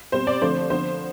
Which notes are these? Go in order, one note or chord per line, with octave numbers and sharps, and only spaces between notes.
B2 G3 C4 C5
D5
D3 F3 A3 C4 C5
D3 F3 B3 C5